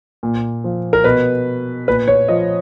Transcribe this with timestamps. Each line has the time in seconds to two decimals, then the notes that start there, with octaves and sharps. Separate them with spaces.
0.23 A#2
0.64 F3
0.93 A#4
1.04 B2 B4
1.88 A#2 B4
2.08 C#5
2.28 F3 D#5